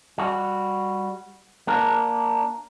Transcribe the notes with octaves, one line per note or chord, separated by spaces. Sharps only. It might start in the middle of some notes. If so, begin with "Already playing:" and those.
G3 F#4
A#3 D4 A#4